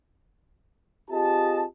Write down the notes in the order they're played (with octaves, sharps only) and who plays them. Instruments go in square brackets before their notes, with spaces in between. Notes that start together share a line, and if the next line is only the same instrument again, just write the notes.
[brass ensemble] C4 F4 G4 G#4 D#5 A5